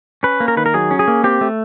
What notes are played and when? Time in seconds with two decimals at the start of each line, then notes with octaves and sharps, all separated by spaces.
0.23 C#4 B4
0.40 A#3
0.48 A#4
0.57 D#3 B4
0.66 A#4
0.74 F#3 G#4
0.91 C#4
0.99 G#4
1.08 A#3
1.24 C4 G4
1.41 A3